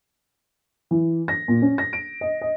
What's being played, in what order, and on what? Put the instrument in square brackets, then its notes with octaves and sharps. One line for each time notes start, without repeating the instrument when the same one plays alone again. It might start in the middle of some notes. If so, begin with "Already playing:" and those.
[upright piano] E3
A#6
A#2
C#4
A#6
D7
D#5
D#5